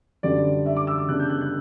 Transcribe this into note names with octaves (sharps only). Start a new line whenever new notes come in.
F#2 D3 G3 D5
E5
D6
E6
D6
C#3 G3 B3 D4 F#6
G6
F#6
F#6